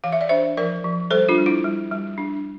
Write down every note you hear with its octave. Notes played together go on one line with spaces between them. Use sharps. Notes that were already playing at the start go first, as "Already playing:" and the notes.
E3 F5
E5
D5
D4 C5 E5
F3 A#4 D5
F3
G3 A4 C5
D4 F4
G3
E4
G3
G3
D4